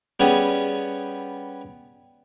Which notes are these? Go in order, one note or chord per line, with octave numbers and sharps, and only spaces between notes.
G3 B3 C#4 G#4